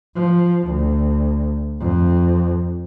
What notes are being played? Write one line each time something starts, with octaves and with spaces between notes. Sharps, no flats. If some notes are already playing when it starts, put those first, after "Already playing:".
F3
D2
F2